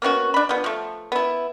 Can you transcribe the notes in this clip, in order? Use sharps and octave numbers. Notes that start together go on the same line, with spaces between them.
A#3 B3 C#4 F#4
D4 B5
F3 B3
F3 A3
B3 E4